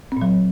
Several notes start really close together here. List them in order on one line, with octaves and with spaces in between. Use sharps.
C4 A#2 F#3